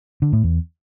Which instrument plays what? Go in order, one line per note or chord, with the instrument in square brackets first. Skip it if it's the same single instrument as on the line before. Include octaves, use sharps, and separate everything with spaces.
[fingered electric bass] D3
A2
E2